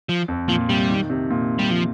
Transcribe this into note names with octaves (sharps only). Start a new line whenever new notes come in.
F3
F2
A#2 F3
C3 G3
D#3
C3
A#2
G3
F3